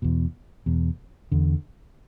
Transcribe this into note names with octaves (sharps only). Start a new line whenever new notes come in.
E2 B2
E2 B2
E2 D3